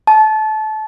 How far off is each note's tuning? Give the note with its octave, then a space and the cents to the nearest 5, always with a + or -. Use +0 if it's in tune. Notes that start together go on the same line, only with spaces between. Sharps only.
A5 -25